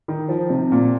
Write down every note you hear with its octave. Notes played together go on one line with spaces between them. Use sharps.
D#3
F3
C3
A#2